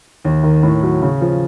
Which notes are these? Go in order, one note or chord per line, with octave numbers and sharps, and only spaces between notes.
D#2
D#3
A2
F#3
C#3
F3